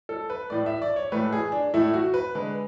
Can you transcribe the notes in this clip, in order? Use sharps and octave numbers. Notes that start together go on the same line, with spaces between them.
A4
B4
A2 E3 A3 D5
E5
D5
C#5
A2 E3 A3 B4
G#4
D4
A2 E3 A3 E4
F#4
B4
D3 G#3 B4